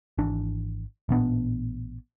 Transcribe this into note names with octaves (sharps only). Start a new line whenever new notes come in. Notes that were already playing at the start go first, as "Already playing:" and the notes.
G#1 E3 D4
A1 A#2 B3 D4